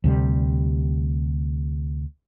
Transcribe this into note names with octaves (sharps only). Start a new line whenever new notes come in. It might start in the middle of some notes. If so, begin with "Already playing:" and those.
D2 C3 G3